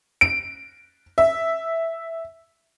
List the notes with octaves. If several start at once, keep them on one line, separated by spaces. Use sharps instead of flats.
D7
E5